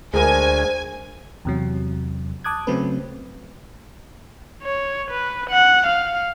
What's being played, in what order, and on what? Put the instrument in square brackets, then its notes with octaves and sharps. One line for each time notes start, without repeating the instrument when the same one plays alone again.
[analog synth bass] D2 [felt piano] G#3 A#4 [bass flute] C5 [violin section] G#5
[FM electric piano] E2 C3 F#3
A5 D6 D#6 F#6 G#6
C#3 F#3 A3 C4 C#4 B4
[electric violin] C#5
B4
F#5
F5